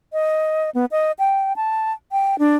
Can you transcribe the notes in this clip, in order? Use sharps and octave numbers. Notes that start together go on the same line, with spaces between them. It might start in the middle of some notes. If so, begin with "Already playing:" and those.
D#5
B3
D#5
G5
A5
G5
D4